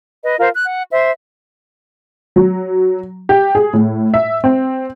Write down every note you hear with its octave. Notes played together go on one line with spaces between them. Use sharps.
B4 D#5
F4 A#4 C5
F#6
F#5
C5 E5
F#3
G4
G#4
A2
E5
C4